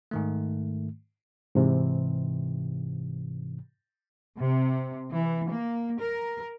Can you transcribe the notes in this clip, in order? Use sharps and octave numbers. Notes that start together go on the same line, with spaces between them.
G#2 D#3 A3
G#2 C3 E3
C3
E3
A#3
A#4